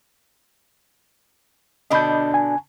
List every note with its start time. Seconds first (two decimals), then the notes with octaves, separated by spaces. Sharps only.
1.90 B2 D3 D4 D#5 B5 G6
2.34 G#5